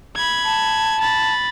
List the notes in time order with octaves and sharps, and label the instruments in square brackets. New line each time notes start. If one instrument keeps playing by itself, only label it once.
[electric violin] B5 G#6
[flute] A5
[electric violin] B5 A6